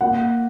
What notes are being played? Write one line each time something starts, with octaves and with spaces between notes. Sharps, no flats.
A#3 F#5